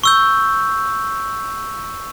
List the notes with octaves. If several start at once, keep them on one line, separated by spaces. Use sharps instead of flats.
C#6 E6 G6